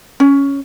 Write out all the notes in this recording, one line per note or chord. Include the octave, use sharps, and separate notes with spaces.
C#4